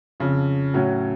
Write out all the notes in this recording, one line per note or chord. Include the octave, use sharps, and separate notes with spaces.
F2 C#3 F3
A2 F#3 C#4 F#4